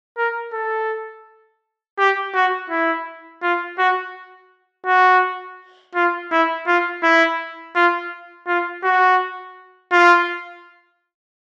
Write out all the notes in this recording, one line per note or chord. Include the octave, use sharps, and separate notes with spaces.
A#4
A4
G4
F#4
E4
F4
F#4
F#4
F4
E4
F4
E4
F4
F4
F#4
F4